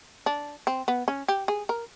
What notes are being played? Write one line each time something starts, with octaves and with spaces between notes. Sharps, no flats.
D4
C4
B3
C#4
G4
G#4
A#4